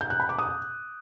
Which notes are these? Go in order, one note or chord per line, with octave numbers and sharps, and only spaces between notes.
G6
F#6
B5
D6
D#6